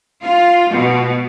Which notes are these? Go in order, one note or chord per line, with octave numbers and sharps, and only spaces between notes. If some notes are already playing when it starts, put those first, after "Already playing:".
F4
B2